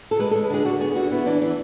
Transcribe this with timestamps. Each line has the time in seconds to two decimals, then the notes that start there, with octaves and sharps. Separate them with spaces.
0.11 A4
0.19 G#3 B4
0.31 A4
0.35 G#3
0.43 B4
0.50 D3 G#4
0.65 D3 F#4
0.80 B3 G#4
0.96 D3 F#4
1.11 B3 E4
1.26 E3 D4
1.41 E3 D4